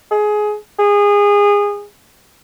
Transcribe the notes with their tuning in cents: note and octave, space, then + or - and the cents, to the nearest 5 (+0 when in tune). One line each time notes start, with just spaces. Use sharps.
G#4 +20
G#4 -25